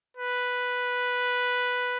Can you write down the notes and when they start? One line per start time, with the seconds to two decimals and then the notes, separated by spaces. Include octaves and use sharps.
0.17 B4